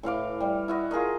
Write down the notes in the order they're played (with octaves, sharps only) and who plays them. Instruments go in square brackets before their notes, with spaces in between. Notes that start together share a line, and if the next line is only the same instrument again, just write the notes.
[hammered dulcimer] A2 E3 F5 D6
G3
E4 F#4 D#5
F4 G#4 A#4 D#5